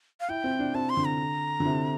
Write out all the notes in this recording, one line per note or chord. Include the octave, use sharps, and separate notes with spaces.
F5
E4 G5
C4
D4
C4 A5
C6
D3
A#5
D3
C3